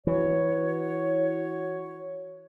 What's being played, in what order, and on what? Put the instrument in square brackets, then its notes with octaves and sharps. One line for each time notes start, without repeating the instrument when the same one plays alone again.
[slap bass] E3 [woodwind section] F#4 C#5